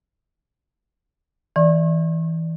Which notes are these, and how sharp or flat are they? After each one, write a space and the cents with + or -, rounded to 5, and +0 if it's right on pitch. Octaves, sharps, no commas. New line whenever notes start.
E3 -20 D5 +0 C#6 -40